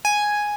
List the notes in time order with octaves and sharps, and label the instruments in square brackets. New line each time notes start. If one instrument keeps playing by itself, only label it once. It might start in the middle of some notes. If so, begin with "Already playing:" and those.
[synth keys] G#5